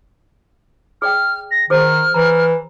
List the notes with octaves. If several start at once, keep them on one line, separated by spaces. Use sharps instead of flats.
G#4 D5 G5 F6
A#6
D#3 G#4 C5 F6
E3 A#5